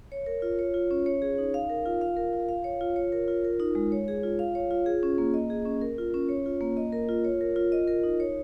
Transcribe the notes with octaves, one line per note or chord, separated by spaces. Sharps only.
C#5
A#4
F4
C#5
F4
C#4
C#5
G#4
D#4
F5
A#4
F4
F5
A#4
F4
F5
C#5
F4
C#5
A#4
F4
A#4
D#4
G#3
C#5
G#4
F4
F5
C#5
F4
G#4
C#4
A#3
D#5
G#4
C#4
A#4
F4
C#4
C#5
F4
A#3
D#5
A#4
F4
C#5
A#4
F4
D#5
A#4
D#4
C#5